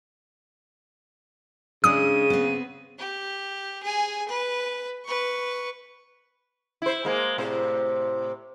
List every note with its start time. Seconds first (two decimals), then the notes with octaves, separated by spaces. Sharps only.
1.84 C#3 G#3 D4 D#4 D#6 D#7
2.30 B3 C4
2.99 G4
3.83 G#4 G#5
4.28 B4
5.05 B4 C#6
6.82 E4 C5
7.05 G#3 A#3
7.38 A2 C3 C5